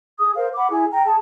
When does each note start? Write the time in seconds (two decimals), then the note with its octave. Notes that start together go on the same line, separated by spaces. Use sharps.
0.20 G#4 D#6
0.36 A#4 C5 F5
0.55 F#5 B5 D6
0.71 E4 G#4 G#5
0.92 G5 A#5
1.05 G#4 A5